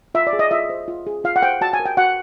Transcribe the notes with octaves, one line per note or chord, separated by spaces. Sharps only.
F4 E5
D5
G#4
D#5
F4 E5
C5
F4
G#4
F4 F5
F#5
C5 G5
F#4 A5
G#5
A#4
G5
F#4 F#5